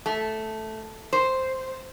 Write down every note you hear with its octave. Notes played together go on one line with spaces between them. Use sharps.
A3
C5